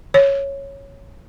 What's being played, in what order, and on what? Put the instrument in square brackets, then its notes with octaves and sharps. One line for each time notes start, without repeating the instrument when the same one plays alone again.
[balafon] C#5